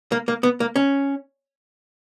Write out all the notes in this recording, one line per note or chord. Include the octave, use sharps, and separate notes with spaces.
A#3
A#3
B3
A#3
C#4